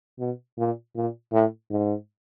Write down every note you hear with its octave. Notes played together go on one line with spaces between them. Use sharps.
B2
A#2
A#2
A2
G#2